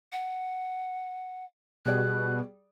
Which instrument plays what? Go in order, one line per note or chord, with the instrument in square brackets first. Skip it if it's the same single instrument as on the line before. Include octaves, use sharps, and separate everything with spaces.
[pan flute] F#5
[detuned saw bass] B2 [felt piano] G3 G#4 D5 [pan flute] F#6